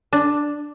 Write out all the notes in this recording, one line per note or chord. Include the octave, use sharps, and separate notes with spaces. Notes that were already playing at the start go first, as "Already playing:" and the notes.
D4